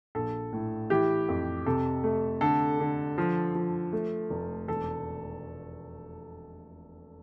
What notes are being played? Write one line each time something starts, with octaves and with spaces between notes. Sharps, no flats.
A#1 A4
A2
E3 G4
F2
C3 A4
A3
D3 A4
D3
F3
F3
A3
F1
E1 A4